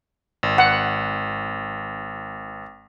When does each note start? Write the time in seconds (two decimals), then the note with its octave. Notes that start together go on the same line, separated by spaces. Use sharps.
0.43 G#1
0.58 F#5